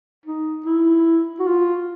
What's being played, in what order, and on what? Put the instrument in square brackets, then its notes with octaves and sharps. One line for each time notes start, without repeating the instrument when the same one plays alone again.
[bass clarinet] D#4
E4
F#4
F4